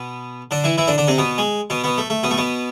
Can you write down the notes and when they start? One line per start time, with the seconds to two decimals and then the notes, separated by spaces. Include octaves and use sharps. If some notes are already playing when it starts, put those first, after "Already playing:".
Already playing: B2 B3
0.51 D3 D4
0.64 E3 E4
0.78 E3 E4
0.87 D3 D4
0.98 D3 D4
1.08 C3 C4
1.18 B2 B3
1.38 G#3
1.70 B2 B3
1.84 B2 B3
1.98 A3
2.10 A3
2.23 B2 B3
2.31 A3
2.37 B2 B3